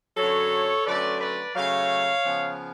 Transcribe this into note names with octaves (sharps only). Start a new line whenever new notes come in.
F#2 D3 F#3 A4 C#5
D3 F#3 A3 C#4 B4 D5
B4 D5
C#3 F#3 A3 C#5 F5
C#3 F3 B3